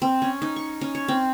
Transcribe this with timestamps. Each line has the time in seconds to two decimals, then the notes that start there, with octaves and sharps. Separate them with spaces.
0.02 C4
0.22 C#4
0.42 D#4
0.56 C#6
0.81 C#4
0.95 C#5
1.08 C4